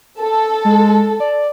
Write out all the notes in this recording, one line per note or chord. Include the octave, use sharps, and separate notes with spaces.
A4
G#3
D5